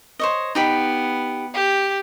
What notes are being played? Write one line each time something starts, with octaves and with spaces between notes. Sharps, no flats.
C5 C#5 D#5
B3 D#4 G4 B5
G4